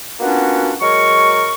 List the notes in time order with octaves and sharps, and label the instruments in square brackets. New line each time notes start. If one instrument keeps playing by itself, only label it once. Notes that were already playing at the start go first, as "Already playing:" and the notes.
[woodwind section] A#3 B3 C#4 D4 F4 F#4
F#3 G#3 A#4 C#6